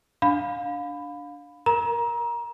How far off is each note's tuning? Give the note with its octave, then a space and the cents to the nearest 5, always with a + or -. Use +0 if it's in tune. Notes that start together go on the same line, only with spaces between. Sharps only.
D4 +0 F5 +25 B5 +15
A#4 +0 A#5 +25